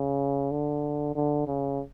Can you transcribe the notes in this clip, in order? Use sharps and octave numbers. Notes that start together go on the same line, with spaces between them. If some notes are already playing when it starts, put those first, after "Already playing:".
Already playing: C#3
D3
D3
C#3